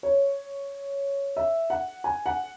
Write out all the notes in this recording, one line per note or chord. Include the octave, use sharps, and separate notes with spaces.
C#5
E5
F#5
G#5
F#5